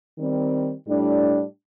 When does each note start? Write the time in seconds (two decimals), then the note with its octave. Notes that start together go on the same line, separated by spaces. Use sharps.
0.16 D#3 G3 C4
0.87 A2 G3 D4